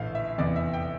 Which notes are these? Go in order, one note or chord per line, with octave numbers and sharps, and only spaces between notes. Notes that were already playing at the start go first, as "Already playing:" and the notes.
Already playing: A#1 A2 E3 F5
E5
F1 E2 E3 D5
E5
G5